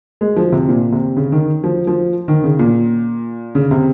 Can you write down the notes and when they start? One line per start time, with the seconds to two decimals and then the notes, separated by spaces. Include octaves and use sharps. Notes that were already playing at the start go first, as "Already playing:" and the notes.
0.21 G#3
0.37 F3
0.52 C3
0.69 A#2
0.92 C3
1.17 C#3
1.32 D#3
1.64 F3
1.87 F3
2.28 D#3
2.44 C#3
2.59 A#2
3.55 C#3
3.71 C3